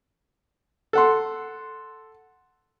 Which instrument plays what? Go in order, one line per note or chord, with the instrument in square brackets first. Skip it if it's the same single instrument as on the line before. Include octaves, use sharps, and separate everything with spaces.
[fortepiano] A4 F#5 C6